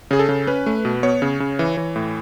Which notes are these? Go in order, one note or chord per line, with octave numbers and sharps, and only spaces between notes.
C#3 G#4
A4
C#3
C#4 B4
A3
B2
B3 C#5
C#3
C#3
E3
E3
A2